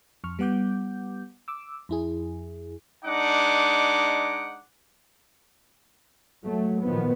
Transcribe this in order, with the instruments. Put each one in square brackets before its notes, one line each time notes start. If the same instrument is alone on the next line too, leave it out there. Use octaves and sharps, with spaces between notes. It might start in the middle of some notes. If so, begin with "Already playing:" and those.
[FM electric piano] F2 C#6 F6
G3 B3 F#5 D6 G6
D6 E6
F2 E4 G#4
[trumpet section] G#3 D4 D#4 F#5 D6
[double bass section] F#3 A3
A#2 D#3 F3 B3